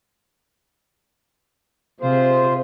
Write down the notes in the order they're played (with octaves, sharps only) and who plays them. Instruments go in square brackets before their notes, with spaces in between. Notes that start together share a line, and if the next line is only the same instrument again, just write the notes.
[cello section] C3 G#4 [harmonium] F4 C5